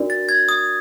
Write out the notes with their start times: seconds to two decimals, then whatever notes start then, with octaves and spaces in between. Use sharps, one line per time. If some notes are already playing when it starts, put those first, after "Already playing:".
Already playing: D4 F#4 A#4 D5
0.10 A6
0.29 G#6
0.49 D#6